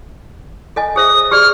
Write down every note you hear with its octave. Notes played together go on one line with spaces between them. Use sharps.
A4 D#5 G#5
G#4 C5 E5 D#6
G4 G#4 D5 F6